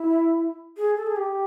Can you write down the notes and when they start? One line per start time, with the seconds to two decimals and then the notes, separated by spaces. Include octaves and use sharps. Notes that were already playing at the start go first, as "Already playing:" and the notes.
Already playing: E4
0.77 G#4
0.97 A4
1.07 G#4
1.16 G4